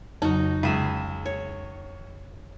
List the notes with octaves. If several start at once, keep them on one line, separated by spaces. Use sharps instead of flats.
F2 C#3 F#3 D#4 F#4
C#2 G#4 E5
C#5